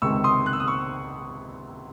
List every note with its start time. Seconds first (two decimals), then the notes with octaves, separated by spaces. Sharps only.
0.02 C#2 C3 D#3 G#3 C4 C#6 E6
0.24 C6 D#6
0.46 F#6
0.53 E6
0.60 D#6
0.67 C#6 E6